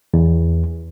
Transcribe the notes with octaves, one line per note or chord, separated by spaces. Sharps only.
E2